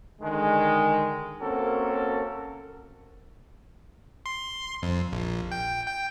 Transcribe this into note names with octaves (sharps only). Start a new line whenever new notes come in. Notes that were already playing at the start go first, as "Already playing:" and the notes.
D3 D#3 G#3
A#3 C4 C#4 F#4 A4 A#4
C6
F2
A#1
G5
G5